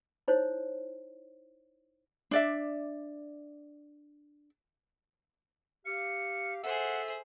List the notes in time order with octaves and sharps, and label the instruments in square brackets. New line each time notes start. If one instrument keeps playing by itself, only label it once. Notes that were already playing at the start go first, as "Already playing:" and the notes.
[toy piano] D#4 E4 C5 C#5
[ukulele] D4 D5 E5
[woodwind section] G4 F5 [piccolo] C#7
[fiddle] G#4 C5 [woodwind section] A4 E5 [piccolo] F#5